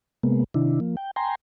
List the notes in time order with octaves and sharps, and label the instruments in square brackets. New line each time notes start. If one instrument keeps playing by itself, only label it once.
[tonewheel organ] C3 G#3 A#3 B3
C3 D#3 D4 E4
F3 A#3
G5
G5 G#5 A#5 C6